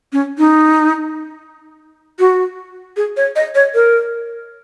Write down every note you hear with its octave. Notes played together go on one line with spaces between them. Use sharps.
C#4
D#4
F#4
G#4
C#5
D#5
C#5
A#4